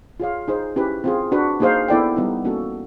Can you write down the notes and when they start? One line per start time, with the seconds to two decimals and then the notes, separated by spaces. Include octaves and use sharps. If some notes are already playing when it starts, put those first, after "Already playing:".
0.20 F4 G#4 C#5 F5
0.48 D#4 G#4 C5
0.76 C#4 E4 G4 B4
1.04 C4 F4 G#4
1.32 D4 F#4 B4
1.60 A#3 D#4 G#4 C5 F5
1.88 B3 E4 A4 D5 G5
2.16 G3 B3 D#4
2.44 A#3 C#4 F#4 A4